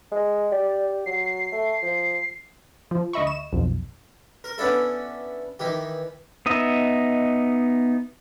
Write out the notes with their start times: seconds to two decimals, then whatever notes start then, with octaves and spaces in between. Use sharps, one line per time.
0.12 G#3
0.52 G4 D5
1.06 F#3 C7
1.52 A3
1.82 F3
2.91 F3
3.13 D2 D#5 E5 B5 C#6
3.27 E7
3.53 B1 F2
4.44 A#4
4.58 B3 C#4 D4 E4 A4
5.59 D#3 E3 G4
6.46 B3 D#4 D#5 E5